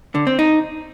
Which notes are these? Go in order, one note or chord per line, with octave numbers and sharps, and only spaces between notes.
D3
C4
D#4